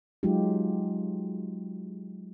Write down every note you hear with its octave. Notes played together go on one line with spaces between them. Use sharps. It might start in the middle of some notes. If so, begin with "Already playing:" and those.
F#3 G#3 D#4 F4 G4